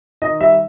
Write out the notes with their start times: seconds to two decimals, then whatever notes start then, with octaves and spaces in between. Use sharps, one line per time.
0.22 D#3 D#5
0.40 G3 E5